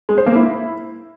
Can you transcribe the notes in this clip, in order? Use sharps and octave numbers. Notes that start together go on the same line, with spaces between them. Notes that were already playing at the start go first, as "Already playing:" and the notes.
G#3
C5
A#3
E4